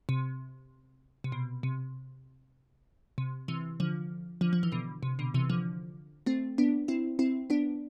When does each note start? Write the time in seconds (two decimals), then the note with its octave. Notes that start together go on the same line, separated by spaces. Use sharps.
0.09 C3
1.24 C3
1.32 B2
1.63 C3
3.18 C3
3.48 C3 E3
3.80 D3 F3
4.41 D3 F3
4.53 F3
4.63 E3
4.72 B2 D3
5.03 C3
5.19 B2 D3
5.34 C3 E3
5.49 D3 F3
6.26 A3 C4
6.58 B3 D4
6.88 C4 E4
7.19 C4 E4
7.50 B3 D4